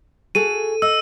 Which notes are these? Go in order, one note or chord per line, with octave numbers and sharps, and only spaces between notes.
F#4 G#4 A4 D#7
D#5 E6